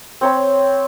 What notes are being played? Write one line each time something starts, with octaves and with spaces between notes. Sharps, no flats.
C4 C#5 B5